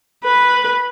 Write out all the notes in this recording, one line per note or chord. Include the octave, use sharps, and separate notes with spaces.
B4